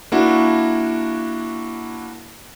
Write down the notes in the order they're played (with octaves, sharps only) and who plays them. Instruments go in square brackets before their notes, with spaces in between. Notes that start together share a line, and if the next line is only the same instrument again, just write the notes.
[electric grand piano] A#3 D4 E4 F#4